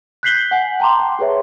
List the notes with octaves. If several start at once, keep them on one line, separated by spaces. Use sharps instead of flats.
F#6 G6 B6 C7 F#7 G7
F#5 G#5
G5 A5 A#5 C6 D6
G5
G4 G#4 B4 C#5 E5